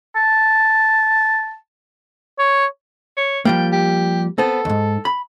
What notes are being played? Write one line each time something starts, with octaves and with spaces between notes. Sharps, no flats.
A5
C#5
C#5
F3 G3 A#3 G5
G4
B3 C4 A4
D#2 G#2
B5